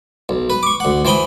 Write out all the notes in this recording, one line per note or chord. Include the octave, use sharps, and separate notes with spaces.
B1
B4
C#6 D6
D2 F#5
E3 C5 G5 B5 D#6